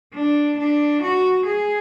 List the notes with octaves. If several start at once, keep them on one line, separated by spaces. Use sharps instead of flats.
D4
D4
F#4
G#4